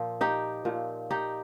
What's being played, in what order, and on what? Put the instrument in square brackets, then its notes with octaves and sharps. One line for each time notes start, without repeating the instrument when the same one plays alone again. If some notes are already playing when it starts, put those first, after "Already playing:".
Already playing: [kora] A#2 F3
D#4 G4
A#2 F3
D#4 G4